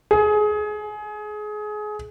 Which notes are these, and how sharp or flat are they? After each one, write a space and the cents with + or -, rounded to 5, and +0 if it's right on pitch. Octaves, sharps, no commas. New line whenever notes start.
G#4 +25